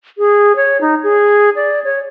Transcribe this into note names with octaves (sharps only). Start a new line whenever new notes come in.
G#4
C#5
D#4
G#4
D5
C#5